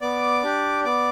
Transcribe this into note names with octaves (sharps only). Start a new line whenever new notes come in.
B3 D5 D6
D4 G4
B3 D5 D6